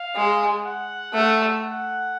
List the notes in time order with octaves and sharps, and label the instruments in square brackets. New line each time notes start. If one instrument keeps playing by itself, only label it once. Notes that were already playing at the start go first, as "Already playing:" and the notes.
Already playing: [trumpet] F5
[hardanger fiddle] G#3
[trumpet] F#5
[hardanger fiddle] A3
[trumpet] F#5